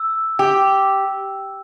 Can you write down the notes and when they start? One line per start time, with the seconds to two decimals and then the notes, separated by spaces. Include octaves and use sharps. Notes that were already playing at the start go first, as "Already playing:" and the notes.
Already playing: E6
0.39 G4